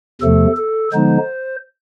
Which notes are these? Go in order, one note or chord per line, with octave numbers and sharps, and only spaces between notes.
E2 C3 F3 A3 A4
A4
D3 F3 G#3 B3 D#4 C5